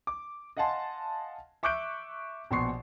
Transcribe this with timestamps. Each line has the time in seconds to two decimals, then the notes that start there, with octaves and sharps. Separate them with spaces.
0.07 D6
0.57 D#5 F5 F#5 G#5 A5 C6
1.63 E5 C#6 D6 F#6 G6 D7
2.51 A#1 B2 C6 C#6 C7